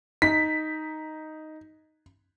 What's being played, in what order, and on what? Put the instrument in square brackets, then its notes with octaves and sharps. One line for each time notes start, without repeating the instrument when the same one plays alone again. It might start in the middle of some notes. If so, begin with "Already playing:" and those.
[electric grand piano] D#4 [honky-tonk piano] B6